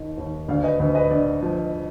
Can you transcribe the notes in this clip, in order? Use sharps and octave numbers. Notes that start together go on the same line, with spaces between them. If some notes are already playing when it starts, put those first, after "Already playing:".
Already playing: D#2 D#3 D#5
D#2
D2 D5 F5
B4 D#5
D2 B4
B4 D#5
D3 D5
F3